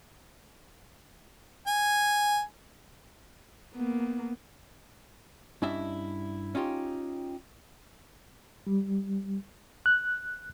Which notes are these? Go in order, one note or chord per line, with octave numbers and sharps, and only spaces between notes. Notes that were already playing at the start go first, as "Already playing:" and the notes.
G#5
A#3 B3
G2 C#4 D4 E4 D#5 E5
C#4 D#4 F4 G4
G3
F#6